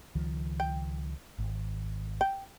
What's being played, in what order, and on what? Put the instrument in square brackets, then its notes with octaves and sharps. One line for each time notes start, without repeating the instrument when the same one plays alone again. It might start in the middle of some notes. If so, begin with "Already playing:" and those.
[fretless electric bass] C#2 D#3 F3
[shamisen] G5
[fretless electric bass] G#1
[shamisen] G5